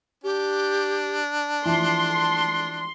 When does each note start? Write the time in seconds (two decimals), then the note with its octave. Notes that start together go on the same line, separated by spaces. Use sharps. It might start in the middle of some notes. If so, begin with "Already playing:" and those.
0.24 D4 G4
1.66 E3 F3 A5 C6